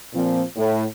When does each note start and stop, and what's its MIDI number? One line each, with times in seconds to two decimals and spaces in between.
0.13 0.42 46
0.13 0.42 53
0.13 0.42 60
0.56 0.84 45